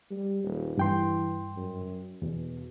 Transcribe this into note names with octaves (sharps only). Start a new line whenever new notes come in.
G3
D#1
G2 E3 G5 C6
F#2
E2 B2